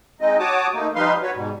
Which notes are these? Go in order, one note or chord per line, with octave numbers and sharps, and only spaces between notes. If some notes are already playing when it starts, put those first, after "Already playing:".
G#3 C4 D#4 D#5
F#4 C#5 A5 D6 D#6
A3 A#3 D#4
F3 G3 D#4 B4 F5 C6
F#4 B4 C#5
G#2 B2 G3